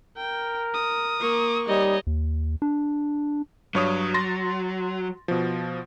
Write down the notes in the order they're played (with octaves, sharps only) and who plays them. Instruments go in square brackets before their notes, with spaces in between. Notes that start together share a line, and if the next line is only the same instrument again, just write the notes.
[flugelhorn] A#4 [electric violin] G5
[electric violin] D#6
[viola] A#3 C#6
[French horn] G3 [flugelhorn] D#4 [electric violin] C#5 D#5
[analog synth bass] D#2
D4
[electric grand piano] G2 C#5 D#6 [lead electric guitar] F#3
[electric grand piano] C6 A6 A#6
B2 F3